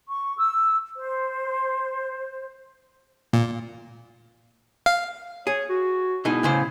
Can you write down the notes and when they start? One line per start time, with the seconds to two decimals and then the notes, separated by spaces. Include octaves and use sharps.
0.08 C#6
0.37 E6
0.97 C5
3.33 A#2
4.86 F5
5.47 G#4 C#5
5.69 F#4
6.25 B2 D#4 E4 G#4
6.43 A2 C#3 C5